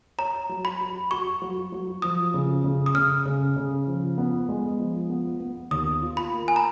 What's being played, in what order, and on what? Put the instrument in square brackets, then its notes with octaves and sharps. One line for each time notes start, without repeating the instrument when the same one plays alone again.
[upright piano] C#5 [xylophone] A#5
[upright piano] F#3
[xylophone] B5
[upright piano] F#4
[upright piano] F#4 [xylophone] C#6
[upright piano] F#3
F#3
[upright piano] F3 [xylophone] D#6
[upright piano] C#3
C#3
[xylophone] D#6
[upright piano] C#3 [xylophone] F6
[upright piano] C#3
C#3
F3
B3
G#3
F3
B3
B3
[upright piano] D#2 [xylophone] D#6
[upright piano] F4
[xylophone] B5
[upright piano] A#3
[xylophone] G#5
A#5